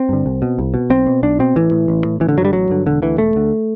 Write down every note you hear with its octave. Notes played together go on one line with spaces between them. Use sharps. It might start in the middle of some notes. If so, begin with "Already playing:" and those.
Already playing: C4
G2 D3
C2
B2
C2
B2
B1 C4
B2
B1 D4
B2 C4
A1 E3
A2
A1
A2
A1 E3
D3
G2 D3 F#3 G3
A1 F#3
G2 D3
E1 D3
D2 D3 E3
E1 A3
D2 D3